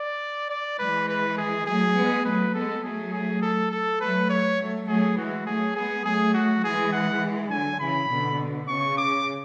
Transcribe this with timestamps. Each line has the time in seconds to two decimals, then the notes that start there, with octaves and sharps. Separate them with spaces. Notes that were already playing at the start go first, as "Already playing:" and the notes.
Already playing: D5
0.50 D5
0.79 E3 G#3 B4
1.08 B4
1.37 G#4
1.67 F#3 A3 G#4
1.96 G#3 B3
2.25 F#3 A3 B4
2.54 G#3 B3 A4
2.83 F#3 A3 G#4
3.13 G#4
3.42 A4
3.71 A4
4.00 F#3 A3 B4
4.29 C#5
4.58 F#3 A3
4.88 F#3 A3 G#4
5.17 E3 G#3 F#4
5.46 F#3 A3 G#4
5.75 G#3 B3 G#4
6.05 F#3 A3 G#4
6.34 F#4
6.63 E3 G#3 G#4
6.92 F#5
7.51 D3 F#3 G#5
7.80 C#3 E3 B5
8.09 B2 D3
8.68 C#3 C#6
8.97 D6